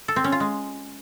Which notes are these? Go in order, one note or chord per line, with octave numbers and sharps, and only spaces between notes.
A4
C4
C#4
F4
G#3